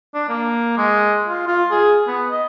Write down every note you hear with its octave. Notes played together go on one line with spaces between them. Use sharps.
D4
A#3
G#3
F4
F4
G#4
B3
D#5